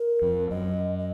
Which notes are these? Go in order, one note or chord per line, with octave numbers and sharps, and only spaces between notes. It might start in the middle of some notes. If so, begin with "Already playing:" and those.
Already playing: A#4
F2
F#2 D#5
D#5